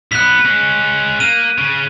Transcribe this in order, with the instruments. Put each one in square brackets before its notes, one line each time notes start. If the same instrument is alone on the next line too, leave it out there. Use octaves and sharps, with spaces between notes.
[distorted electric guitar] B1 B3 [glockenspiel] F#6 B6
[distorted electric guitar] G#3 C#4
[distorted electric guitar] A#3 [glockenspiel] D#7
[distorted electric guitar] C#3